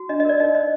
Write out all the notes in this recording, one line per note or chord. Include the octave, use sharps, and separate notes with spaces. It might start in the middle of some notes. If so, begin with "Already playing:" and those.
Already playing: F#4
D4 D#5
D#5
A#4 D5
D#4 D#5
C5 D#5